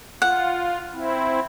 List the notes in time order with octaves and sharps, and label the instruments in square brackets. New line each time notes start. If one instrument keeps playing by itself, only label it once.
[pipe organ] F4 [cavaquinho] F#5
[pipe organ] C4 E4